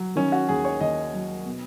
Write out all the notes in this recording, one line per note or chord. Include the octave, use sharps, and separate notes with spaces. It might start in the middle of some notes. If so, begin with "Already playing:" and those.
Already playing: F#3
D#3 C#4
F#4
D#2 G#4
C#5
D#2 D#5
F#3
B2